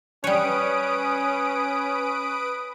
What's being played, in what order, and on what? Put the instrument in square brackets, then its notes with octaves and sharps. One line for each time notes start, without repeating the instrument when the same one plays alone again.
[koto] G3 C#5 [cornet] C#4 [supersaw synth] B4 D#6 D7